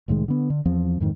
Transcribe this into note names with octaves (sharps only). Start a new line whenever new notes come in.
C2 A2 D#3 G#3
D3 B3
D3
E2 F3 C4
F2 G#2 D#3